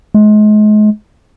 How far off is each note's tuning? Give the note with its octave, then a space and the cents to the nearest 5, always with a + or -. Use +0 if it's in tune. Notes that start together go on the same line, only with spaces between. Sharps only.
G#3 +35